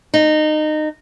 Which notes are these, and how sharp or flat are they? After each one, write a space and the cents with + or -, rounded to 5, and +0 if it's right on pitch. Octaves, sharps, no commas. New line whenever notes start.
D#4 -20